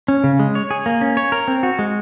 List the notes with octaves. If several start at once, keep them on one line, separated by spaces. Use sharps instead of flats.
C#4
C#3
G#3
C#5
G#4
A#3
C#4
C#5
A#4
C4
F#4
G#3